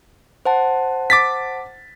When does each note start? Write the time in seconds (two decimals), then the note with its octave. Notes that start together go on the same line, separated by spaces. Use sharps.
0.46 C5 F#5 A5
1.10 D6 A6 B6